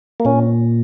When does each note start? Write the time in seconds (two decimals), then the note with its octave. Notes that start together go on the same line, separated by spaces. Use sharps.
0.20 A#3
0.25 A#2 C#4